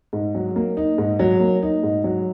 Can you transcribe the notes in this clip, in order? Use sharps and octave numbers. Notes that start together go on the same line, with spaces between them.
G#2
F#3
A#3
D#4
G#2
F#3
A#3
D#4
G#2
F#3